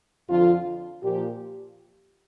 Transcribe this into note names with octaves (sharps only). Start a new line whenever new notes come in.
F2 D3 F3 F4
A#2 F3 G4